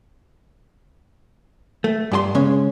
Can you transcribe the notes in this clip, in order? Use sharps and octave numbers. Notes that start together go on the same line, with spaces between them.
A3
G2 G4 C6
C#3 G#3 C#4